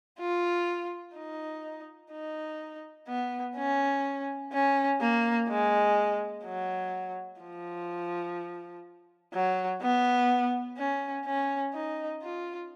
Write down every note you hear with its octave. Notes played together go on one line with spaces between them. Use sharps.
F4
D#4
D#4
B3
C#4
C#4
A#3
G#3
F#3
F3
F#3
B3
C#4
C#4
D#4
F4